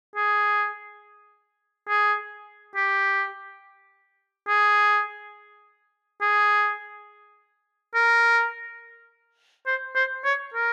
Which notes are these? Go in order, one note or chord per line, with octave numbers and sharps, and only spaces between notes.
G#4
G#4
G4
G#4
G#4
A#4
C5
C5
C#5
A#4